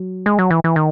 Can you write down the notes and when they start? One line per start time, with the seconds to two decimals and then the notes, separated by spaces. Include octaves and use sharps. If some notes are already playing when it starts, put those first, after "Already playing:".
Already playing: F#3
0.26 G#3
0.39 F#3
0.50 E3
0.64 E3
0.76 D#3